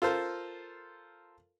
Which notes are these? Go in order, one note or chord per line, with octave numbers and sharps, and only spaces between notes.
F4 A4 A#4 C5